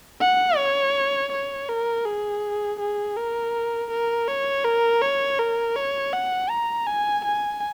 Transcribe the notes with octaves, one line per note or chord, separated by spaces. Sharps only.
F#5
C#5
C#5
A#4
G#4
G#4
A#4
A#4
C#5
A#4
C#5
A#4
C#5
F#5
A#5
G#5
G#5